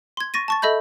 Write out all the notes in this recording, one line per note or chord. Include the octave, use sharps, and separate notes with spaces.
C6 G#6
C#6 A6 A#6 D#7
A5 C#6 A6
A4 D#5 E5 B5 G6